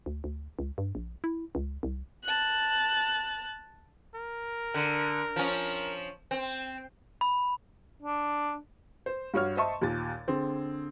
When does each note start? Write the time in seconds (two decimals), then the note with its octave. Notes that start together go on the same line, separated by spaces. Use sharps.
0.06 D2
0.24 D2
0.59 C#2
0.78 G2
0.95 A#1
1.24 E4
1.55 C#2
1.83 C2
2.24 A5 F#6
4.15 A#4
4.74 D3
5.36 F3 C#4
6.31 C4
7.21 B5
8.02 D4
9.06 C5
9.34 G2 F#4 C#5 F6
9.57 C5 D#5 E5 A5 C6 C#6
9.81 D#2 A#2 A6
10.27 D3 C4 G#4